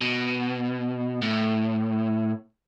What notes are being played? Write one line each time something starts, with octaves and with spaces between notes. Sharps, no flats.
B2
A2